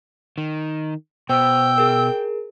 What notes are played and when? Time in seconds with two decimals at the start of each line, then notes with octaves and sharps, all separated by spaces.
0.38 D#3
1.29 B2 C5 G5 E6
1.78 G#4 A#4